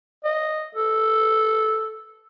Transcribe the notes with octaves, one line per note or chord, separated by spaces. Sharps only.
D#5
A4